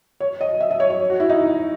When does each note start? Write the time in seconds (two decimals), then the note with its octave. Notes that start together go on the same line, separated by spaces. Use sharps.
0.20 C#5
0.41 D#5
0.60 E5
0.71 D#5
0.80 C#5
0.90 C#5
1.10 F#4
1.20 E4
1.29 D#4